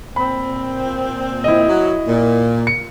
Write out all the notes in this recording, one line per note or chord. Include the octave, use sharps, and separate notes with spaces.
A#2 C4 B5
E4 D#5
F#3
A#2
C#7